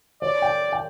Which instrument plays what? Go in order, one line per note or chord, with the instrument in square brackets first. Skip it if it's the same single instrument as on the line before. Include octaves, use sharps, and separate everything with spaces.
[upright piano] C#5 [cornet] D5
[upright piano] G5
G5